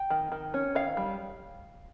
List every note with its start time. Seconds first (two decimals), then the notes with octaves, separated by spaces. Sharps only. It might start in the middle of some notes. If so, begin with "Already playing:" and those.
Already playing: G5
0.10 D#3
0.32 D#3
0.54 C#4
0.75 D#3 F5
0.97 G3